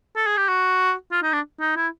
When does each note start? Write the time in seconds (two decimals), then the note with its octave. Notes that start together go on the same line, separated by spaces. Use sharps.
0.16 A4
0.27 G#4
0.37 G4
0.48 F#4
1.12 F4
1.23 D#4
1.33 D4
1.60 D#4
1.76 E4